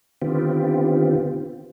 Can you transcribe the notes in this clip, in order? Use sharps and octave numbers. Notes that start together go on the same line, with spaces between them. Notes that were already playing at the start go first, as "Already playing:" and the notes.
D3 D#3 B3 C4 F4 G4